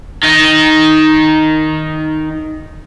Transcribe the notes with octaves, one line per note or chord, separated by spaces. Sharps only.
D#3 D#4